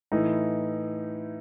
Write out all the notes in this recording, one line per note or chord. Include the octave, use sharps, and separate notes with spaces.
A2 E3 D#4